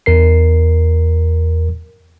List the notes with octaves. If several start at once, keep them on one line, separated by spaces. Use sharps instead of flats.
E2 A#4 C7